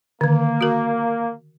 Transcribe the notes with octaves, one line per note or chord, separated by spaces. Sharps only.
D3 D#3 A#3
F#4 A#4